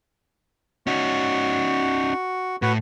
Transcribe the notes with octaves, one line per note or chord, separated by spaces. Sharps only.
C#4 D#4 F#4
A2 F#4 B4